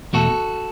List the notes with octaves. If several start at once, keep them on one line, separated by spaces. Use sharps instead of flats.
E2 B2 A3 F#4 A4